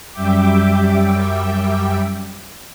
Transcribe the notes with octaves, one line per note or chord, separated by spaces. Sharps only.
F#2 G3 E5 G5 D6